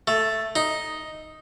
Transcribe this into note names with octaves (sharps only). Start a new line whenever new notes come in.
A3
D#4